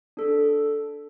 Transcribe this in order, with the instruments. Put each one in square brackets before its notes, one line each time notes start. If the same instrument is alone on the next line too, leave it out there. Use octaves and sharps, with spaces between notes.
[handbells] D4 A4